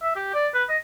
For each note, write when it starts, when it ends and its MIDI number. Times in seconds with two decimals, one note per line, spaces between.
0.03 0.16 76
0.16 0.30 67
0.34 0.47 74
0.54 0.64 71
0.69 0.77 75